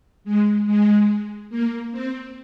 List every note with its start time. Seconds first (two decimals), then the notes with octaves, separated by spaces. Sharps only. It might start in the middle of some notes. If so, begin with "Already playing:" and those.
0.24 G#3
0.66 G#3
1.49 A#3
1.91 C4